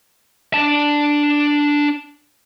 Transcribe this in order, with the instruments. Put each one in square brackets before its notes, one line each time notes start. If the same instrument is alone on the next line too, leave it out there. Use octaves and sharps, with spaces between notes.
[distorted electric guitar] D4 A5